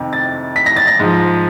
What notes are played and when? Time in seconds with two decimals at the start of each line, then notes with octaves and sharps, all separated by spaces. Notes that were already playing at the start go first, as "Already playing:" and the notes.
Already playing: F2 C3 D#3
0.13 A6
0.56 B6
0.66 A#6
0.76 A6
0.87 A#6
0.99 G#2 F3